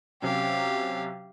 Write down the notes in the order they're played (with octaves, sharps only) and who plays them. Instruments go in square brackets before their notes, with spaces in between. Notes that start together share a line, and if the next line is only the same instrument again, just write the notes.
[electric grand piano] C3 F#3 C#4 [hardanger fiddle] G4 F5